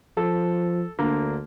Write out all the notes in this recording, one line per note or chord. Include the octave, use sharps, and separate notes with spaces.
F3 A4
D2 D3 A#3